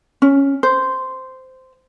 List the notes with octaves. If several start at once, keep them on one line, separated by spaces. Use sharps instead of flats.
C#4
C5